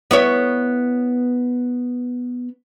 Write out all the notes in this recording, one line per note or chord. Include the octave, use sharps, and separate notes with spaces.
B3 E4 C#5